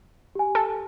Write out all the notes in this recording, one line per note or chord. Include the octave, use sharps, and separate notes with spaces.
G4 G#5
A4